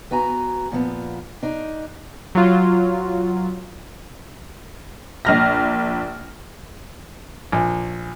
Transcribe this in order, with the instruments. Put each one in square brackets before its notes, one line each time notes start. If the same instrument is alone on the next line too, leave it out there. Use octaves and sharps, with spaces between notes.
[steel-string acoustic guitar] B3 F#4 G#5 A#5
A#2 F3 B3
D4 D#4
[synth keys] F#3 F4
[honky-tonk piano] A#1 F6 A#6
[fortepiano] A#1